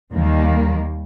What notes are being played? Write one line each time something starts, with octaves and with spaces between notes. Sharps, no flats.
D#2 D#3 G3 A#3